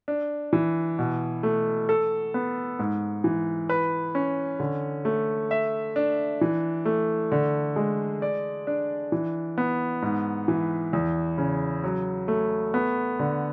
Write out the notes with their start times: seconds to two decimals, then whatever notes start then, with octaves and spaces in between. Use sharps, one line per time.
0.08 D4
0.53 E3
0.99 B2
1.43 A3
1.89 A4
2.34 B3
2.79 G#2
3.24 E3
3.69 B4
4.15 C#4
4.60 D3
5.05 A3
5.51 E5
5.96 D4
6.41 E3
6.85 A3
7.32 D3
7.76 G#3
8.22 D5
8.67 D4
9.12 E3
9.58 B3
10.02 G#2
10.48 E3
10.93 E2
11.38 C#3
11.84 F#3
12.28 A3
12.74 B3
13.19 D3